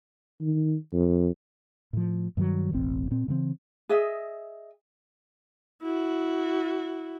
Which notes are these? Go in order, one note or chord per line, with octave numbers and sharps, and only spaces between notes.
D#3
F2
A2 F3
G2 D#3 E3 F#3
E1 A1 C4
A#2 C4
C#3 E3 A3 C4
G#4 D#5 E5
E4 F#4